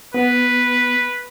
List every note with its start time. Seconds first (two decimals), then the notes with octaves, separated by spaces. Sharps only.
0.14 B3 B4